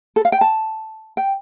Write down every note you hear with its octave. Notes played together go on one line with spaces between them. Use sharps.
A4
F5
G5
A5
G5